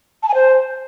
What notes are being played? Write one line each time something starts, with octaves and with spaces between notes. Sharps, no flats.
A5
G#5
C5